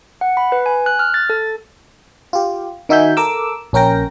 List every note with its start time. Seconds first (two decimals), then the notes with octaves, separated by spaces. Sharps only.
0.21 F#5
0.37 B5
0.52 B4
0.66 G#5
0.86 F#6
0.99 F6
1.14 A6
1.30 A4
2.33 F4 G4
2.89 D#3 D#4 F#4 E5 G#5 G6
3.17 A4 A#4 D6 E6
3.73 A#1 C#4 A#4 G5 A#6